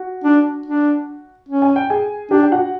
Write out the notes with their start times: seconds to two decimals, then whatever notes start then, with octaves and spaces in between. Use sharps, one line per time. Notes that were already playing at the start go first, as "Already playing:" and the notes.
Already playing: F#4
0.24 D4
0.66 D4
1.49 C#4
1.62 G#5
1.76 G5
1.90 G#4 G#5
2.31 D4 G4 G5
2.42 G5
2.52 F#4 F#5